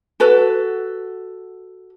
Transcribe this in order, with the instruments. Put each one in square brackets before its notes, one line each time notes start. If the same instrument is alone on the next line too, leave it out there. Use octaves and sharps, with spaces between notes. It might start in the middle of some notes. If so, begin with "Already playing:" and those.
[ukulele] F#4 A4 B4